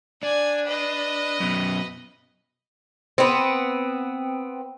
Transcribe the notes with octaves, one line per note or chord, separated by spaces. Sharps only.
D4 D5 G#5
B4 D#5
F#2 B2
B3 C4